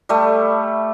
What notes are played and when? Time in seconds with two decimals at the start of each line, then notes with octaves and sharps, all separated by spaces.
0.09 G3 A3